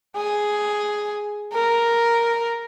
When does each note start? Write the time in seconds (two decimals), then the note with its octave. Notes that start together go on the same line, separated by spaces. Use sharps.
0.17 G#4
1.53 A#4